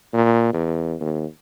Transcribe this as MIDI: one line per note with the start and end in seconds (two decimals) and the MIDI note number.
0.14 0.49 46
0.53 0.94 40
1.00 1.25 39